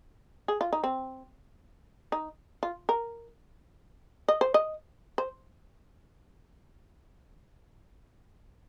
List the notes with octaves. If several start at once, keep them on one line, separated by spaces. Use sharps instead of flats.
G#4
F4
D#4
C4
D#4
F4
A#4
D#5
C5
D#5
C5